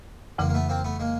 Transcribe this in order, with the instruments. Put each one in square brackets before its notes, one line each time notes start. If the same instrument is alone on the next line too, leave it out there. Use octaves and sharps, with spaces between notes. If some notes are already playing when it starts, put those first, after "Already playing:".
[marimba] F2 C#3 E3 [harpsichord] G#3 A#3
[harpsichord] A#3
A3 B3
A#3 C4
A3 B3
G#3 A#3